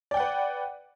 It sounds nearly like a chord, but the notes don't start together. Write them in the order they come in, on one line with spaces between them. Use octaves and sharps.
D5 G5 F#5 B4